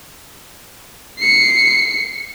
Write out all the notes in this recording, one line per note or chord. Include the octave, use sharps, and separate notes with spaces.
C7 C#7